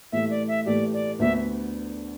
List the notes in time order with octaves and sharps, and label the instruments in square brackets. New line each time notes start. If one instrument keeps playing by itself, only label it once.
[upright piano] A2 E3 A3 G4 [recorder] E5
[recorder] D5
E5
[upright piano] A2 E3 A3 G4 [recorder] D5
[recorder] D5
[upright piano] D2 D3 B3 [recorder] E5